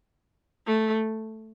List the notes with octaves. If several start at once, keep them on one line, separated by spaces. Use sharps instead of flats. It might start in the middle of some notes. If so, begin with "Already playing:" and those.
A3